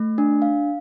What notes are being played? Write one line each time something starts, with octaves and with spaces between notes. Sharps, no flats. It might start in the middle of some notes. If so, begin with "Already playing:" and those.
Already playing: A3
D4
F5